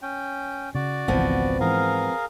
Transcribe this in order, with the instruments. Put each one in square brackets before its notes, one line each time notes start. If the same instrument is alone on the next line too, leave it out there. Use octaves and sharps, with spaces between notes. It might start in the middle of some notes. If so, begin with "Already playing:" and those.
[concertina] C#4 G5
[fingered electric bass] C#3 [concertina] F#4 D5
[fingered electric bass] G#1 C#2 E3 [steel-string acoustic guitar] F3 B3 C4
[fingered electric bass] G#2 E3 [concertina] G#4 A#4 F5